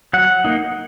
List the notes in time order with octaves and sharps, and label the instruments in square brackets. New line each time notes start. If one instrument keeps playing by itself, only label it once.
[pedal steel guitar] F#3 F#5
A#3 D#4